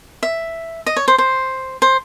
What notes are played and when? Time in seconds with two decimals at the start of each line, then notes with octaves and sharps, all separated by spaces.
0.23 E5
0.86 D#5
0.97 C#5
1.08 C5
1.18 C5
1.82 C5